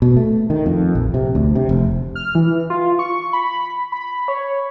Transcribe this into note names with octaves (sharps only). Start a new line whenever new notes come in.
B2
A3
D#3
F2
A#1
C3
D2
C3
F1
F6
E3
F4
C#6
B5
B5
C#5